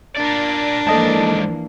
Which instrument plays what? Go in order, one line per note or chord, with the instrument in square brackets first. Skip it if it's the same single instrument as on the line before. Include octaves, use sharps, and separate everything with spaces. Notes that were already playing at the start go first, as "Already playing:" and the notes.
[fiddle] D4 [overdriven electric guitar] A#4 D5
[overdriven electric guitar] G#2 D5 [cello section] E3 F3 A#3 [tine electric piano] A4 D#5 A5